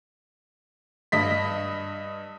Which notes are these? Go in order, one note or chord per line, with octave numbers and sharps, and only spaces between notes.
G2 D#5 B6